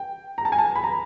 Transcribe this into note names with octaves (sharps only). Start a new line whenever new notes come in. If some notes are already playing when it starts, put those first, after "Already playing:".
Already playing: G5
A#5
A5
G#5
A5
B5
A#5